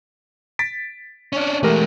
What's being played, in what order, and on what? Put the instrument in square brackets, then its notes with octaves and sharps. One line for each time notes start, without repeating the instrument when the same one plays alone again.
[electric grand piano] A6 B6 D7
[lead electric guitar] C#4 D4
[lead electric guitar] E3 G#3 [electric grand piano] A3 G4 A#4